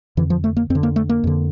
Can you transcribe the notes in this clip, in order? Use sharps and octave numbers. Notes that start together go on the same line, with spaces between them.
F2 D3 E3
F3
A3
A#3
F2 C4
D3
A#3
A3
A#3
F2 D3